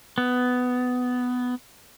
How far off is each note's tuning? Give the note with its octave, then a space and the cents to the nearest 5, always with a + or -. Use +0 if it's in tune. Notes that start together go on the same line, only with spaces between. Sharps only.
B3 +10